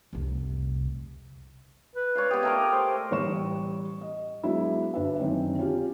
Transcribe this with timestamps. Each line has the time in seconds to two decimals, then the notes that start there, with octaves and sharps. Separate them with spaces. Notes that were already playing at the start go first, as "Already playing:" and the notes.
0.13 F1 C2
1.95 B4
2.15 C#5 D5 F5
2.31 B3 G4 D#6
2.43 A3 A#4 D5
2.72 C5
3.11 A1 G3 C#5 C#6 E7
4.01 D#5
4.43 F#3 G#3 B3 D4 E4 F#4
4.94 G1 D3 D4 B4 E5
5.19 F#2 D#3 C4 C#4
5.59 C#4 F4 G4